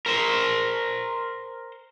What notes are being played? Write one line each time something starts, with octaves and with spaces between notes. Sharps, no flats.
A#4 C5